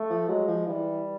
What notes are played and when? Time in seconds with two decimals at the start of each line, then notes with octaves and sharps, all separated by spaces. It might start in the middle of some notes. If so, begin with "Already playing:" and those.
Already playing: A3
0.10 F3
0.28 F#3 G#3
0.47 F3
0.67 E3 G3